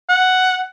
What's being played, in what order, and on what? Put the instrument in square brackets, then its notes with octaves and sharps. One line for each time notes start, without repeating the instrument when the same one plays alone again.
[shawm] F#5